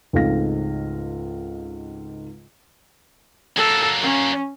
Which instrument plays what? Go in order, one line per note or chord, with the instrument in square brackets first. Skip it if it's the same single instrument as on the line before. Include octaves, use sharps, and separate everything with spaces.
[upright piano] C#2 G#2 A3 C4 F5 A#6
[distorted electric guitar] F#3 A#3 [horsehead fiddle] A4
[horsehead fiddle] C#4